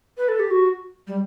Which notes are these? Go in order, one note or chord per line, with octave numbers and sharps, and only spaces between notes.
B4
A4
G4
F#4
G3